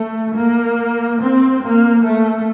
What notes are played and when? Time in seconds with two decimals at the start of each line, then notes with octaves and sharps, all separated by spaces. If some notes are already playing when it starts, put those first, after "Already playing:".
Already playing: A3
0.35 A#3
1.18 C4
1.62 A#3
2.04 A3